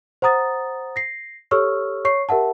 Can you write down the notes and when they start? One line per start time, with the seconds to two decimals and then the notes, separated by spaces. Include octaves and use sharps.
0.22 C5 F#5 A#5 D#6 A6
0.96 A#6 C7
1.51 G4 A4 C#5 C#6 E6 F6
2.05 C#5 C#6 C7
2.29 G4 A#4 E5 F#5 A5